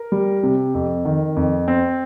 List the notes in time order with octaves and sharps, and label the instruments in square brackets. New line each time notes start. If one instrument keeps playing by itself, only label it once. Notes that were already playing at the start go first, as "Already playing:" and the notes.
Already playing: [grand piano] A#4
G3
C3
F2
D#3
F2
C4